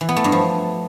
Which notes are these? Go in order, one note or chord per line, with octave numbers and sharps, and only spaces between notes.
E3
B3
A3
G2
F3